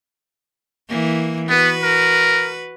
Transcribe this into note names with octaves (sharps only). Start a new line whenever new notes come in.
E3 A#3
B3 F#4 B4
A#4